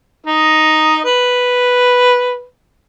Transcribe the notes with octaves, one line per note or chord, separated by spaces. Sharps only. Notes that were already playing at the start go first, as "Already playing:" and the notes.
D#4 D#5
B4